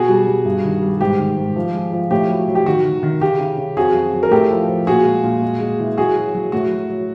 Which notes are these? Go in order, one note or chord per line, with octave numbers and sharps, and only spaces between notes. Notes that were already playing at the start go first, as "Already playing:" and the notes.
Already playing: B2 F#4 G#4
G3
G3
G2
D#3
G3
G#2 G4
D#3
G#2
F3
G#3
F3
A2 G4
F#3
F#3
G4
D#3 F#4
D#3
D#3
C#3 G4
C#3
C#3
F2 F#4 G#4
F#3
F#3
A#4
A2 G4 A4
F3
F3
A#2 F#4 G#4
G#3
A#2
G#3
G#3
E3
F#3 F#4 G#4
F#3
F#3
A2 F#4
F#3
F#3